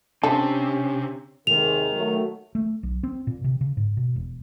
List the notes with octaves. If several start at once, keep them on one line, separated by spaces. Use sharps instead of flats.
C3 C#4 D4 A4
D#2 C3 D#3 G#3 F7
F#3 A3
A3
B1
C4
A#2
C3
C#3
G#2
B2
E1